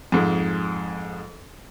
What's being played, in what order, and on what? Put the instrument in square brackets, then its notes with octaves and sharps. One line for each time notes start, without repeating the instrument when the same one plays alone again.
[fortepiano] F2 G#2 G#3